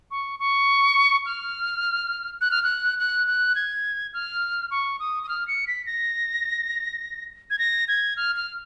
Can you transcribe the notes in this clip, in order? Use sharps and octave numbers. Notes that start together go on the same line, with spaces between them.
C#6
C#6
F6
F#6
F6
F#6
F#6
F#6
G#6
F6
C#6
D#6
D#6
F6
C#7
B6
A#6
G#6
A#6
G#6
F6
F6